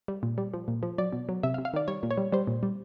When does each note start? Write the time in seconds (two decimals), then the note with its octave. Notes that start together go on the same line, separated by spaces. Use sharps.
0.08 G3
0.23 A#2
0.38 G3
0.54 F3
0.68 A#2
0.83 F3
0.98 F#3 D5
1.13 B2
1.29 F#3
1.43 C3 E5
1.54 F5
1.58 C3
1.65 F5
1.74 D#3 D5
1.88 G3 C#5
2.03 A#2
2.11 C#5
2.17 G3
2.32 G3 C5
2.47 A#2
2.63 G3